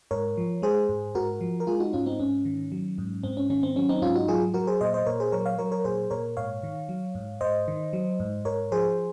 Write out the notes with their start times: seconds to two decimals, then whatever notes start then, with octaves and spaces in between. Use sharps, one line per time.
0.11 G#2 A#4 C#5
0.37 F3
0.62 G#3 G#4 C5
0.89 G#2
1.15 G#2 F#4 A#4
1.41 F3
1.60 A#4
1.67 G#3 F4 G#4
1.80 D#4 F#4
1.93 G#2 C#4 F4
2.06 C4 D#4
2.20 G#2 C#4
2.45 D#3
2.72 F#3
2.98 G#2
3.23 G#2 C4
3.37 C#4
3.50 D#3 C#4
3.63 C4
3.76 F#3 C#4
3.89 C4 D#4
4.02 G#2 C#4 F4
4.15 D#4 F#4
4.28 F#3 F4 G#4
4.54 F#3 F#4 A#4
4.67 G#4 C5
4.81 A#2 C5 D#5
4.93 C5 D#5
5.06 A#2 A#4 C#5
5.20 G#4 C5
5.32 F#3 A#4 C#5
5.46 C#5 F5
5.58 F#3 A#4 C#5
5.72 A#4 C#5
5.84 A#2 G#4 C5
6.10 A#2 A#4 C#5
6.37 G#2 C#5 F5
6.63 D#3
6.89 F#3
7.15 G#2
7.41 G#2 C5 D#5
7.68 D#3
7.93 F#3
8.20 G#2
8.45 G#2 A#4 C#5
8.72 F3 G#4 C5